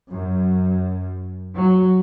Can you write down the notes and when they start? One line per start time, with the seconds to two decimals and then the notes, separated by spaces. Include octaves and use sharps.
0.11 F#2
1.59 F#3